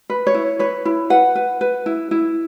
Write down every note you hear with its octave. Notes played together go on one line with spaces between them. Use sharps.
B4
C#5
E4
B4 C#5
E4
B4 F#5
B4
B4
E4
E4